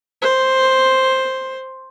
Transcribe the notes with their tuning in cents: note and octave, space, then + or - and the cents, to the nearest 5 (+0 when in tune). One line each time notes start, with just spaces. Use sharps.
C5 +5